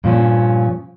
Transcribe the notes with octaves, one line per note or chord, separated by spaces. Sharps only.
G2 A#2 F3 C#4